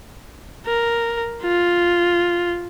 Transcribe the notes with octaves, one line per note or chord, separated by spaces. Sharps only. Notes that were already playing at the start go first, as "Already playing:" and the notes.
A#4
F4